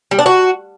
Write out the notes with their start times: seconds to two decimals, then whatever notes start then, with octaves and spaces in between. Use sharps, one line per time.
0.11 G3
0.19 D4
0.26 F#4